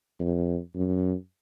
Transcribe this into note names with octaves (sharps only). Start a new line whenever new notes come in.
F2
F#2